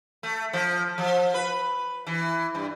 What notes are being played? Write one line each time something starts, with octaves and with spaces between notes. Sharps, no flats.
A3
F3
F3
B4
E3
G2